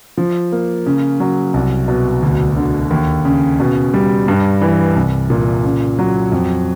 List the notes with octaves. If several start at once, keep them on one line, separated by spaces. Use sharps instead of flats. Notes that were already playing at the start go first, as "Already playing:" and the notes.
F3
A#3
C#3
F#3
C2
B2
D2
D3
D#2
C#3
B2
G3
G2
E3
C2
A#2
C#3
F#3
F2